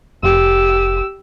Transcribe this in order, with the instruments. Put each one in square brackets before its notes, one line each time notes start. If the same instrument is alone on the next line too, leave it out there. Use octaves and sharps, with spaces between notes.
[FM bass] F1 [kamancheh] G4 E6